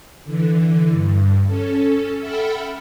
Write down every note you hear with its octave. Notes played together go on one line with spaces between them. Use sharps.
D3 E3
G2
C#4 A4
A4 E5 F#5 G5 B5 F6